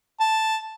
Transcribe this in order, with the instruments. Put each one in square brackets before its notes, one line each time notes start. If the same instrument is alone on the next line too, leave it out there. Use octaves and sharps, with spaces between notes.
[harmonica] A5